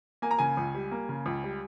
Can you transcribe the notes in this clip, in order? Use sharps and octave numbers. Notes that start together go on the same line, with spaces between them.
A#3 G#5
A#5
C#3 G#5
C#2
G3
A#3
C#3
C#2
G3